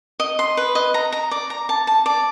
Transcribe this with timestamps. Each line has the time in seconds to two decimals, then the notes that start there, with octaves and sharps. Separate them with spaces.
0.20 D#5
0.39 C6
0.57 B4
0.75 D#5
0.94 A#5
1.12 A#5
1.31 D5
1.50 A#5
1.69 A5
1.87 A5
2.06 D5